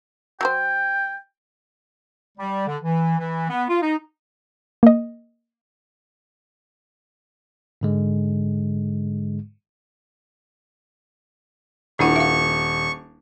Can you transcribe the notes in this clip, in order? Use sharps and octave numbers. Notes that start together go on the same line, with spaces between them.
F#3 A#4 C5 G5
G3
D3
E3
E3
B3
F4
D#4
A#3 D#5
G#2 D3 G#3
D#1 D4 E4 F#5 C#6
E5 F5